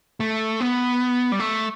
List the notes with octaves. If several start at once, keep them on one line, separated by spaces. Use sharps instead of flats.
A3
B3
G3
A3